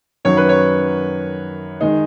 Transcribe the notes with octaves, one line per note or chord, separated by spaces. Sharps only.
F#2 D#3 F#3 C#5
B4
C#5
D#3 G#3 D#4